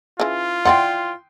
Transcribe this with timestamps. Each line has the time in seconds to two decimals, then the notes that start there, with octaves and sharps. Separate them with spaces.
0.20 C#3 E3 F4
0.65 E3 D5 F#5 G5 C6